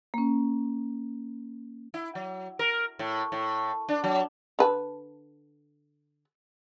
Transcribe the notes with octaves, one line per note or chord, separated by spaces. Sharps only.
A#3 C#4
E4
F#3
A#4
A2
A2
D4
F#3
D3 B4 A5